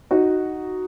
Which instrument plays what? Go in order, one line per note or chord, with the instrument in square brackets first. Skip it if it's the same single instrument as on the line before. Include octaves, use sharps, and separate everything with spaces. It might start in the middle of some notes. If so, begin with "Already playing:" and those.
[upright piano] D#4 F#4